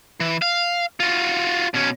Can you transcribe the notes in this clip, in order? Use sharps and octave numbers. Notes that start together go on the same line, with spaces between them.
E3
F5
F4 F#4
B2 C#4